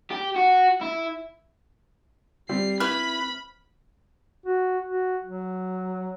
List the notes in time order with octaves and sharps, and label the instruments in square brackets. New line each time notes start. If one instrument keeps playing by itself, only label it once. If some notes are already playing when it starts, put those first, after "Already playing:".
[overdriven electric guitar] G4
F#4
E4
[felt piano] G3 [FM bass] C4 [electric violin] C7
[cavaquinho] E4 B4 [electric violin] B5 [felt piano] F6
[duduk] F#4
F#4
F#3